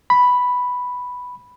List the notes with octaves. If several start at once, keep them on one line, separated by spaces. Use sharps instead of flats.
B5